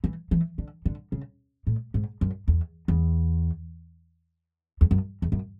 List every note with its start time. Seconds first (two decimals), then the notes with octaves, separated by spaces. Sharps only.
0.04 E3
0.31 E3
0.58 D3
0.86 D3
1.12 C#3
1.67 A2
1.94 G#2
2.21 F#2
2.48 E2
2.88 E2
4.81 E2
4.91 F#2
5.22 E2
5.32 F#2